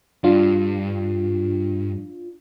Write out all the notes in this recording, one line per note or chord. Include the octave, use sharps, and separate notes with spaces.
G2 D4 F4